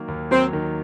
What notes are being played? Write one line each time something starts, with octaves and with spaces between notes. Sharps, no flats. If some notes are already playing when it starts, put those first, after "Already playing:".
Already playing: D#3 F#3 A#3
D#2
F#3 C4
D#3